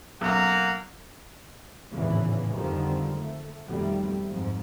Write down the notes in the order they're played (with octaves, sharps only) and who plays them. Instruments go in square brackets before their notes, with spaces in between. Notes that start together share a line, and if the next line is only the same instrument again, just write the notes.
[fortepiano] B1 F#2 [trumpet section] A#3 F#5 A#5
[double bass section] G#1 E2 A2 C#3 E3
F2 D3 D#3 F3 G3
A3
F2 B2 D#3 G3 A3
F2 G#2